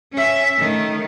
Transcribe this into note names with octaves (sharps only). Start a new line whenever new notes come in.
C#4 E5
D#3 A3